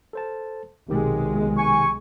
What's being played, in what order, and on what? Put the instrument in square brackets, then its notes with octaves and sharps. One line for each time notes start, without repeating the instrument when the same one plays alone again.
[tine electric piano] A4 C5 A5
[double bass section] B1 G#3 [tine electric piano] C3 D#3 G4
[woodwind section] G#5 C#6